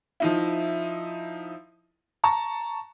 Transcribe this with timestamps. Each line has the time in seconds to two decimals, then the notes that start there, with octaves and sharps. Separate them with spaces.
0.20 F3 D#4 E4
2.24 A5 A#5 C#6